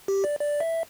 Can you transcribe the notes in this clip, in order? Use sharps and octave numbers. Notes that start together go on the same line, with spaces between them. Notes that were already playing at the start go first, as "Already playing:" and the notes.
G4
D5
D5
E5